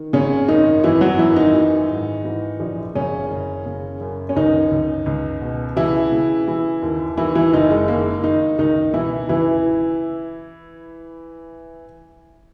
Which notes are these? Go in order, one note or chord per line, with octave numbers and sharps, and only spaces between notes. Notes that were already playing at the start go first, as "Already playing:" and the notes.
Already playing: D#3
G#1 C#3 C#4
F#2 D#3 D#4
G#1 E3 E4
F#3 F#4
F#2 E3 E4
D#3 D#4
E3
G#2
E3
A#1
F#1 C#3 C#4
F#1
C#3
F#2
C#4
C#2 D#3 D#4
C#2
C#2
B2
C#3 E3 E4
C#3
E3
D#2
D#3 E3 E4
E3 E4
F#1 D#3 D#4
G#3
D#3 A#3
D#3 D#4
C#2 D#3 D#4
B2 E3 E4
C#2 E3 E4